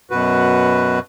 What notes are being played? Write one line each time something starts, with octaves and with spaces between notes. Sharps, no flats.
F#2 B2 F#4 B4